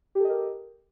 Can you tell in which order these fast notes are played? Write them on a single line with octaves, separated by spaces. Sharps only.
G4 A4 D#5 A#4